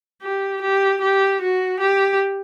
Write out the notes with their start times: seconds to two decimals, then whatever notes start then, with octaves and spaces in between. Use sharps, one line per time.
0.22 G4
0.62 G4
1.01 G4
1.41 F#4
1.80 G4